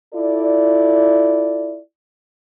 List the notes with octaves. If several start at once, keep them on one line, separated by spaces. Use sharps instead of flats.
E4 F4 A4 D5